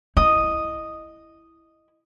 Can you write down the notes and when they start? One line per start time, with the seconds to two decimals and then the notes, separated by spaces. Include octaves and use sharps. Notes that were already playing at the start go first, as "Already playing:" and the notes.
0.17 E4 D#5 D#6